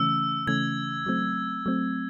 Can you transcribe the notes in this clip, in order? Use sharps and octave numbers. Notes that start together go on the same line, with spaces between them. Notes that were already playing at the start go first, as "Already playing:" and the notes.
Already playing: C#3 E3 A3 C#4 E6
C#3 E3 A3 C#4 G#6
F#3 A3 C4
F#3 A3 C4